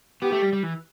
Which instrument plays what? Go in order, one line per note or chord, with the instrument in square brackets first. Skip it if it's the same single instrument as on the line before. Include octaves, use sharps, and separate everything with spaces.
[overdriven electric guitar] B3 [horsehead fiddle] G4
[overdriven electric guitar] A3
G3
G3
E3